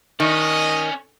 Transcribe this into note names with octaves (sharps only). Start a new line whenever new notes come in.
D#3 C#4 D5 D#5